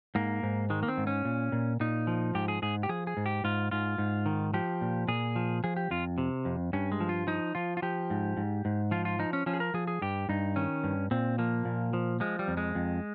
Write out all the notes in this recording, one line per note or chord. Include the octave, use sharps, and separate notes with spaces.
G#2 A#3
G#2
D#3 G#3
A#3
C4
G#2
C#4
A#2
A#2
A#2 D#4
F3
G#2 G4
G#4
G#2 G#4
G4
F3 G#4
G#4
G#2
G4
G#2 F4
G#2 F4
G#2
D#3
F3 G4
A#2
A#2 G#4
F3
F3 G#4
G4
F2 F4
C3
F2
G2 C#4
G#3
F3
F4
F3 D#4
F3 F4
F4
F3 G4
G#2
G#2
G#2
F3 F4
F4
F3 D#4
C#4
F3 C#4
G#4
A#4
F3 G#4
G#4
G2 G4
G2 D#4
D#3 C#4
G2
A#2 C4
F3 A#3
A#2
F3
F3 G#3
G3
F2
G#3
F2